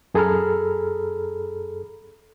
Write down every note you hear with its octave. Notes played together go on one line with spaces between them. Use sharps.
F#2 G#4 A4 A#5 B5 F6